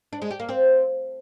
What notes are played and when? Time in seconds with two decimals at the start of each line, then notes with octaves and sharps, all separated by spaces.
0.13 D4
0.22 G#3
0.31 G4
0.40 A#3
0.49 C4